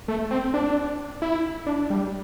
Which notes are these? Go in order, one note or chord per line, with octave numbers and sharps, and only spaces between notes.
A3
C4
D4
E4
D4
G3